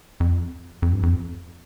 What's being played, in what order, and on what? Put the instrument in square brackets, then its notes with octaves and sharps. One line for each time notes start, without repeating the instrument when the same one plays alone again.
[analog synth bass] F2
F2
G2
F2